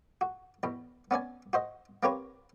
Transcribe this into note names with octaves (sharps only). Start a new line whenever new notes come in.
F#4
E2 B2
B3 C#4 D5 G#5
F#4 C5 D#5
A#3 C4 G4 B4 C#5